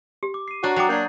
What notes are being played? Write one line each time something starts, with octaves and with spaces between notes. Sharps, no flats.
G4
D6
C7 D#7
D4 F#4 C#5 A#5 C7
F#3 F#5 G5 D6 D#6 A6 C7
A#3 D4 G6 G#6